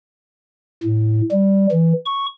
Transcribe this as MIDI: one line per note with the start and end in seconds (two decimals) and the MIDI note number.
0.83 1.21 45
1.31 1.67 55
1.71 1.93 52
2.05 2.26 85